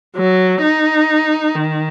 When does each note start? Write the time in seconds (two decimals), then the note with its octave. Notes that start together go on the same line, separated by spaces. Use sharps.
0.16 F#3
0.62 D#4
1.55 D#3